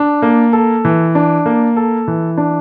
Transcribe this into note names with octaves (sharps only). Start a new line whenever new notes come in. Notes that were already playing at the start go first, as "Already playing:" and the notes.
Already playing: D4
A#3
A4
E3
D4
A#3
A4
E3
D4